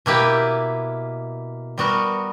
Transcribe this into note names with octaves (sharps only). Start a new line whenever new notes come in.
B2 A#3 E4 G4 B4
G3 B3 F#4 A#4